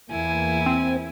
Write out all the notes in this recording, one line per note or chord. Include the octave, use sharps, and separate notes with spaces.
E2 A#3 E4 G#5
C4